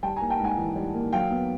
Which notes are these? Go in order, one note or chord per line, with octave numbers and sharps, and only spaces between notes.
G3 G5 A5
G#5 A#5
A#3
G5 A5
G#2 F#5 G#5
E3
G3
A#3
F#3 F5 G5
B3